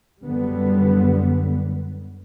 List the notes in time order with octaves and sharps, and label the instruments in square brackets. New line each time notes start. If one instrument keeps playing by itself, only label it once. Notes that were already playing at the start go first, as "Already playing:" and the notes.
[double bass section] F#2 D3 G3 B3